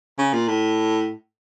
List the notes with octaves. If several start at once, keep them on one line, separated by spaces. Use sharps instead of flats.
C#3
A#2
A2